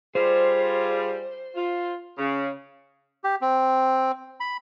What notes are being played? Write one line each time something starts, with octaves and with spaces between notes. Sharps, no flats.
G3 F4 G#4 C5
F4
C#3
G4
C4
B5